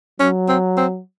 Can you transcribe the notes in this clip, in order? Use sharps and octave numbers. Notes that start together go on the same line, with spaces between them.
F#3 C#4
C4
C4